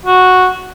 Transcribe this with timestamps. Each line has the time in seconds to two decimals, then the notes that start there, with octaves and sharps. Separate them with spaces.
0.06 F#4